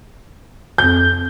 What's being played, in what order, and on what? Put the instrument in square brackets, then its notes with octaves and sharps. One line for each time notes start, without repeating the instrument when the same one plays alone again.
[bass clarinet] F2 [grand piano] G6